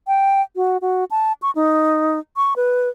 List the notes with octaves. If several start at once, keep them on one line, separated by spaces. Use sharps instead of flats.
G5
F#4
F#4
A5
C#6
D#4
C#6
B4